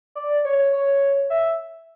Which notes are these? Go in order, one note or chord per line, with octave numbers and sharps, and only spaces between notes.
D5
C#5
C#5
E5